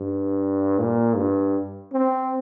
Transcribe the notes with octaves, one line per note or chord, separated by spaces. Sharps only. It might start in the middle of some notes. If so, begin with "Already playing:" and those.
Already playing: G2
A#2
G2
C4